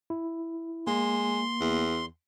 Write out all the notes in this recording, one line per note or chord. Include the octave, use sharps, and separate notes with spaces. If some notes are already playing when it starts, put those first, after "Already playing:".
E4
G#3 A#3 C6
E2